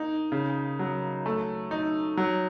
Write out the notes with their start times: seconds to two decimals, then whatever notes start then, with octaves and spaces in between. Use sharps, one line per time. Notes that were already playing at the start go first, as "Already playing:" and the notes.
Already playing: A#3 D#4
0.32 C#3
0.79 F#3
1.26 A3
1.71 D#4
2.17 F#3